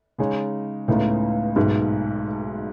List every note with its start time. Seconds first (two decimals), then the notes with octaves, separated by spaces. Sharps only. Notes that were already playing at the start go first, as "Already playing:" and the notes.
0.18 C#3 G#3 D#4 G#4 C#5
0.88 C#2 A2 C#3 G#3 B3 D#4
1.56 B1 G#2 B2 A3